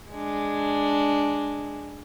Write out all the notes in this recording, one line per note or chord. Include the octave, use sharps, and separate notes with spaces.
G#3 D4